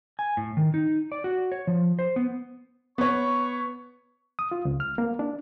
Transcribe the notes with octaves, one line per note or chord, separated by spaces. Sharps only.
G#5
A2
D#3
D#4
D5
F#4
C#5
F3
C5
B3
B3 C#5 C#6
D#6
F4
C#2
F6
A#3
D4